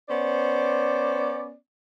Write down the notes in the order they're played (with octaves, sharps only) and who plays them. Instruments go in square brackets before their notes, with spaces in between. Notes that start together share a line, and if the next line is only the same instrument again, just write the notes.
[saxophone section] B3 C#4 C5 D5